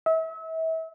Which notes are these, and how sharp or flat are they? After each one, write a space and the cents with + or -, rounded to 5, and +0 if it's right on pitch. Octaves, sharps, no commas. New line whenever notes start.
E5 -35